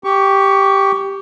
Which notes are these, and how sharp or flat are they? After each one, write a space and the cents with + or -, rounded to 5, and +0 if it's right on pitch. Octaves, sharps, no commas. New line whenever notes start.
G4 +0 C#6 +20